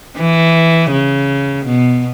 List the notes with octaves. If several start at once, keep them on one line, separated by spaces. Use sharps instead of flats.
E3
C#3
B2